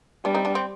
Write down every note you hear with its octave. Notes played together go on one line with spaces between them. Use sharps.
G3 B3 D4
C4 D#4
B3 D4
C4